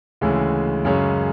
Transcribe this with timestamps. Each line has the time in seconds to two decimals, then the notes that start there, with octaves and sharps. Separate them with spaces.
0.21 D2 C#3 E3 G#3
0.85 F#2 C#3 G#3 C#4